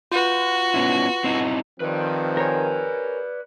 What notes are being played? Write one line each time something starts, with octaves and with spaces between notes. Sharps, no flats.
F4 F#4 B4
B3 C#4 E4
C4 D#4 E4
D#3 F3 C4 B4 D5
A#4 C#5 G#5